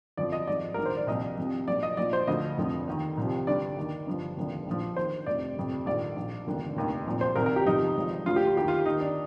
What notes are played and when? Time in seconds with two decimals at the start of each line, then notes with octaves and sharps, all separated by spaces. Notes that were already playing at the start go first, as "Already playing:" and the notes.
0.17 G1 F2 D3 F3 D5
0.32 D#5
0.47 G#1 G#2 F3 D5
0.74 A#1 G#2 D#3 A#4
0.85 C5
0.97 D5
1.07 C2 A#2 F3 D#5
1.37 C2 C3 F3
1.67 A#1 A#2 F3 D5
1.83 D#5
1.97 A#1 A#2 F3 D5
2.13 C5
2.27 D2 D3 F3 D#5
2.57 F1 F2 D3 F3
2.87 D#2 D#3
3.17 C2 C3 F3
3.47 G1 G2 D3 D5
3.77 D#2 D#3
4.07 G1 G2 F3
4.37 F1 D#2 D3 F3
4.67 A#1 A#2 F3
4.96 D#2 D#3 C5
5.26 F1 F2 C3 D5
5.56 G1 F2 C3
5.86 A#1 G#2 D#3 D5
6.16 A#1 A#2 F3
6.46 F1 D#2 D3 F3
6.76 F1 D#2 D#3
7.07 C2 A#2 F3
7.21 C5
7.36 C2 C3 D#3 A#4
7.46 A#4
7.56 G4
7.66 G1 F2 C3 F3 D#4
7.96 G#1 G#2 F3
8.26 D2 D3 F3 F4
8.36 G4
8.47 F4
8.56 D#2 D#3 G4
8.68 F4
8.85 D#2 D#3 D#4
9.00 D4